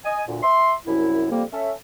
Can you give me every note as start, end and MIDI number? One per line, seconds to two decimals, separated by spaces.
0.05 0.21 75
0.05 0.21 80
0.27 0.39 38
0.27 0.39 46
0.42 0.74 76
0.42 0.74 84
0.86 1.27 36
0.86 1.27 42
0.86 1.27 64
1.30 1.44 41
1.30 1.44 55
1.30 1.44 58
1.53 1.72 61
1.53 1.72 69
1.53 1.72 76